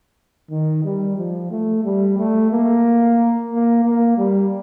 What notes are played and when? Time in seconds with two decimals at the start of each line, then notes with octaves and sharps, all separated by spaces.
0.50 D#3
0.84 G3
1.17 F3
1.51 A3
1.84 G3
2.18 A3
2.51 A#3
3.51 A#3
3.84 A#3
4.18 G3